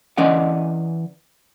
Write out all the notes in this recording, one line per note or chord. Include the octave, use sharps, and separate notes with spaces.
E3 C#4 D5 D#5 F#5